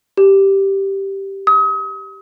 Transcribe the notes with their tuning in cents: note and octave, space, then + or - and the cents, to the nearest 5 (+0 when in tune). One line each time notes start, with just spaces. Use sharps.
G4 -5
D#6 +40